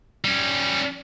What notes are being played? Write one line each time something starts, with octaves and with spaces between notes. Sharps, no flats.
G3 C#4